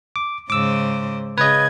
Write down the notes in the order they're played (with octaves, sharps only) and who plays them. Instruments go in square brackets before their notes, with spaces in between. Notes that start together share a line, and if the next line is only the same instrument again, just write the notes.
[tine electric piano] D6
[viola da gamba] G#2 C#3 C5 [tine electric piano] D6 E6
[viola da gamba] C#3 G#4 [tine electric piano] B4 D#5 [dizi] G#6